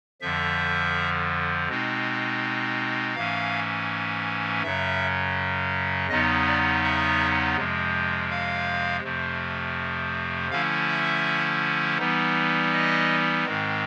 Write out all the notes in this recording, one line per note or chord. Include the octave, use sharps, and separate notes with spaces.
F2 D3 F3 E5
B2 G#3 C4 D#4
G#2 E3 A3 C#4 F5
F#2 C#3 F#3 E5
E2 C#3 F#3 B3 D#4 D#5
D5
E5
F2 C3 F3 G#3
F5
F2 C3 F3 A3
D3 F3 A3 C#4 E4 F5
E5
E3 G3 B3 D#4
D#5
G#2 D#3 G#3 C4